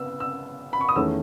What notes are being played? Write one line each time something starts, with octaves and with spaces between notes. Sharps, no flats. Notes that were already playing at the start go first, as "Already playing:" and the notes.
Already playing: C#3 B3 E6
E6
B5
C#6
D#6
E2 D#3 A3 C#4 E6